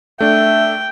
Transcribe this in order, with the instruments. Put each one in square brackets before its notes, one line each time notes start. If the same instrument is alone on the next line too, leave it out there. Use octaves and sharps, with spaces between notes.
[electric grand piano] A3 D4 [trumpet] E5 [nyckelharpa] G5